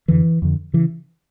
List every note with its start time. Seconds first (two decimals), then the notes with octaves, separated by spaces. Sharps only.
0.08 F2 D3 E3
0.42 F2 D3
0.73 C#3 E3